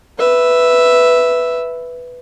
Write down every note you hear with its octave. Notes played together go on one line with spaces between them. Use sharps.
B4 E5